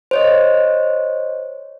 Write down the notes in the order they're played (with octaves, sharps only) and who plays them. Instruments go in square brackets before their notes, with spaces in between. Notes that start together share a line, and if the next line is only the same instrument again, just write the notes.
[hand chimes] C5 C#5 D#5